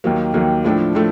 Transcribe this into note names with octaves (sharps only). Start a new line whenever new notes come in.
D#2 D#3 F#3 A#3
D#2 D#3 F#3 A#3
A2 F3 A3 D4
A2 F3 A3